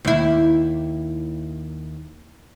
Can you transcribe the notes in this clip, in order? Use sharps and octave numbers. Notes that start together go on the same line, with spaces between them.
D#2 E4